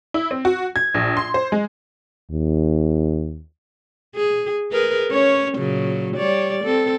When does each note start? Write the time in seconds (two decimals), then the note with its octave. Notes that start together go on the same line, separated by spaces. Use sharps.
0.14 E4
0.31 C4
0.45 F#4
0.76 G#6
0.94 A#1
1.17 C6
1.34 C5
1.52 G#3
2.31 D#2
4.16 G#4
4.72 G#4 A#4 B4
5.11 C#4 C#5
5.58 A#2 C#3 F#3
6.17 G3 C#5 D5
6.64 C4 A4